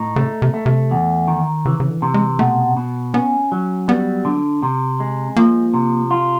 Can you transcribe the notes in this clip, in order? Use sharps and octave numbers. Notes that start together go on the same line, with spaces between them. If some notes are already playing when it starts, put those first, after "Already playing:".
Already playing: A2 D#4
C#3 A3
C3
A3
C3
E2
D#3
C#3 E3
C#3
D3
C3
G#3
B2 A3
B2
B3 C#4
F#3
G3 B3
D3
C3
G#3
F3 A#3
C3
F4